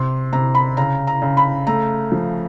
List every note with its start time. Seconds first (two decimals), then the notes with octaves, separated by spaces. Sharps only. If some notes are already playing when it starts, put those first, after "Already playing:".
Already playing: C3 C6
0.33 C3 A#5
0.55 B5
0.77 C#3 A#5
1.07 A#5
1.22 C#3
1.37 B5
1.67 A3 A#5
2.12 F3